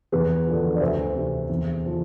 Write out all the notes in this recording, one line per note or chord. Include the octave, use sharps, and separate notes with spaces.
E2 G#4 B4
D3 F3
D5
D2 C5 E5
C3 E3
E2
D3 F3